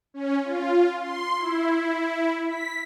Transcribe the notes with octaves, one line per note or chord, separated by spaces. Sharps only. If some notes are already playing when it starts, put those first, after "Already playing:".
C#4
F4
C6
E4
B6